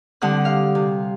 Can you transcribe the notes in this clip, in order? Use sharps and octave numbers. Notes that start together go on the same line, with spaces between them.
D3 G3 C4 F#5 D#6 F#6
F5
C3